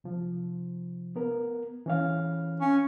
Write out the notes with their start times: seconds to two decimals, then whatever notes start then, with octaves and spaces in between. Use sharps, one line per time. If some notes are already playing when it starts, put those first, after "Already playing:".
0.04 C3 F3
1.16 B3 A#4
1.86 E3 C#4 F5
2.61 C#4